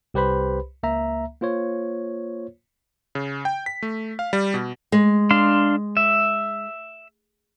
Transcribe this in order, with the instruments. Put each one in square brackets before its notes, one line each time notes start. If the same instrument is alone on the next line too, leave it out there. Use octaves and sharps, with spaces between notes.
[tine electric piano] C2 G4 B4 C5 B5
C#2 A#3 E5 A#5
A#3 F4 C5 C#5
[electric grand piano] C#3
G5
B6
A3
F5
G3
B2
[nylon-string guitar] G#3
[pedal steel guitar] D4 F5 C6
E5